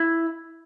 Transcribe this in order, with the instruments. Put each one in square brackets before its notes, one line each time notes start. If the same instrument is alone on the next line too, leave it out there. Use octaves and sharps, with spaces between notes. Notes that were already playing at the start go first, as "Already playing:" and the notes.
Already playing: [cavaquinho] E4